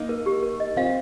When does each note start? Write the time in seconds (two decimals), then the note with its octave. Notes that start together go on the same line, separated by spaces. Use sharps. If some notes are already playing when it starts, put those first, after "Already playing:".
Already playing: A#3 D#4
0.09 A#4
0.26 G4
0.43 A#4
0.60 D#5
0.77 C4 F4 F5